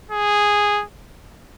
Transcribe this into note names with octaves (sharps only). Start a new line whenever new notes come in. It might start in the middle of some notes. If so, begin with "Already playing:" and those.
G#4